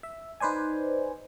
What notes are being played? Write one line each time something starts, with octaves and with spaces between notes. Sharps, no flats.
E5
D#4 B4 C5 D5 G#5